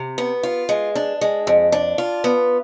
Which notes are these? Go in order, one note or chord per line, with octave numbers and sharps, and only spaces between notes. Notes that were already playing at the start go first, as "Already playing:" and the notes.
Already playing: C3
B3
F4
G#3
D4
G#3
F2
D4
F4
B3